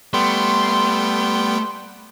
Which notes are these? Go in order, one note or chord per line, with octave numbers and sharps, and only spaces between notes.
G3 A3 B3 G5 C6